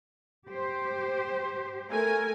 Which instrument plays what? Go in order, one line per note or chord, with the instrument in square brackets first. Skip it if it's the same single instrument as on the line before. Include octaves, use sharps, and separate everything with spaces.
[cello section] G4 C5
[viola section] A3 A#4 G#5